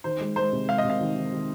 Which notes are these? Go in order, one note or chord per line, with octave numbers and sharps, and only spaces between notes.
D#3 C5
G#3
G#3 C5
C3
G#3 F5
D#5
C3
F5
D#3
D#3
D#3